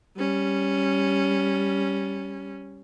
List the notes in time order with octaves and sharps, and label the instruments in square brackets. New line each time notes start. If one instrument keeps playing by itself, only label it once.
[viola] G3 C#4